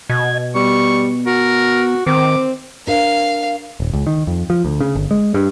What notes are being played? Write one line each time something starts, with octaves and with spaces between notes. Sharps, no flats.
B2 D#5 G#6
G3 B3 C#6
F#4 A#4
D#3 C4 D6
D4 A#4 F5
D#1
C#2
D#3
F2
F3
D2
C#3
G1
G#3
G2